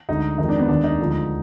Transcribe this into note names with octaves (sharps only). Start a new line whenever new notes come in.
D2 D3 G#3 D#4
F2 D#3 G#3 D#4
D4
B3
D#2 D#3 G#3 D4
D#4
D2 D3 F3 G#3